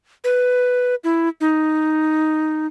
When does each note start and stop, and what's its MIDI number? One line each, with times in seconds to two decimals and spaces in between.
0.24 0.95 71
1.04 1.29 64
1.41 2.67 63